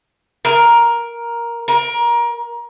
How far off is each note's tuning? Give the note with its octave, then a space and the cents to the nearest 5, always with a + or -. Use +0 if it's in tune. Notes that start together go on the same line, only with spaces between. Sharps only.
A#4 +10
A#4 +25